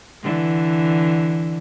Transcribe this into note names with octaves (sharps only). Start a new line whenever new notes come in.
D3 E3